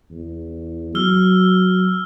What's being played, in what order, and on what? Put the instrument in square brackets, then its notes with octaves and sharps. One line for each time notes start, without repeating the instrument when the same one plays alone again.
[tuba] E2
[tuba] F#3 [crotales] E6 F6 G7